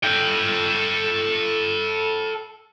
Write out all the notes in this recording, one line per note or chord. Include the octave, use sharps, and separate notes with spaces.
A4 G5